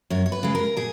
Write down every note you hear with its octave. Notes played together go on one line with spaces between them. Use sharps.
F#2 C#5
C#5
B4
C#3 G#3
A#4
A#2 G#4